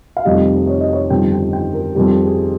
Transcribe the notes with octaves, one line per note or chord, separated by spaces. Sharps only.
F5
F1 F2 D#3 G3 D#5
C#5
D#5
C#5
G1 F2 D#3 G3 G5
G5
G5
A#4
F2 D#3 G3 A#4
G#4